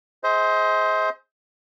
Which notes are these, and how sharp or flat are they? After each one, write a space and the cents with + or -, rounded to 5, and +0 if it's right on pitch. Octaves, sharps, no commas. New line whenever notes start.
G#4 +0 C5 +0 D#5 +40